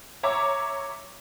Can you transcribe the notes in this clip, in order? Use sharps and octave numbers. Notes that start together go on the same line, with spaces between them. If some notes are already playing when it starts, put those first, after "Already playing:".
C#5 E5 A#5 D6